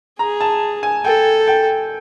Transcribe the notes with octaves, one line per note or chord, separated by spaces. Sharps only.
G#4 A#5
A5
G#5
A4 G5
G5